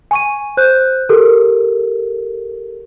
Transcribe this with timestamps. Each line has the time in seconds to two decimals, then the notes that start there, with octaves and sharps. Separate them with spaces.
0.11 G#5 C#6 D#7
0.57 C5 F#6 G6
1.09 G4 A4 A#4